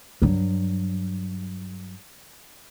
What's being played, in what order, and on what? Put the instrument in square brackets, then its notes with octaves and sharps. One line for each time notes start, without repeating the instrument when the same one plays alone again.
[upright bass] G2 F#3